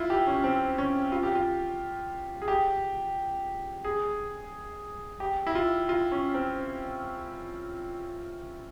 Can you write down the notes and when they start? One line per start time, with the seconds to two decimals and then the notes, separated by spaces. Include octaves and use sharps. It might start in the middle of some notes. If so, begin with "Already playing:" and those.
Already playing: E4 F4
0.10 G4
0.27 C#4
0.44 C4
0.78 C#4
1.12 F4
1.23 G4
1.35 F4
2.42 G#4
2.48 G4
3.84 G#4
5.20 G4
5.47 E4
5.55 F4
5.89 F4
6.12 C#4
6.34 C4